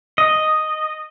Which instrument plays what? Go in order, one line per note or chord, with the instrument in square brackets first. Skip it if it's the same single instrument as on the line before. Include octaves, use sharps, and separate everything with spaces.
[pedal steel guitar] D#5